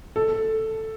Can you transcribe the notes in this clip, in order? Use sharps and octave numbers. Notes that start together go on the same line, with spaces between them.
A4